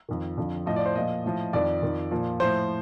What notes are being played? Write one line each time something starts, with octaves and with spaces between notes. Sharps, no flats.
F2 D#3
F2 D3 F3
A2 F3 D#5
D5
C5
A#2 F3 D#5
A2 F3
F2 D#3 D5
F2 D#3
A#2 F3
A2 F3 C5